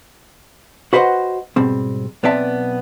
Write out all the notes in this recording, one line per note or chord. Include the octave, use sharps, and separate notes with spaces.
F#4 B4 C5 D#5 F#5
G#2 B2 G3 C4
B1 B3 C4 D5 E5 A5